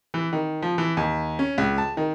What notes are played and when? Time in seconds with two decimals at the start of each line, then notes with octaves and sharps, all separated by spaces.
0.14 E3
0.33 D#3
0.62 F3
0.78 E3
0.97 D#2
1.39 C#4
1.58 C#2
1.78 A5
1.97 D#3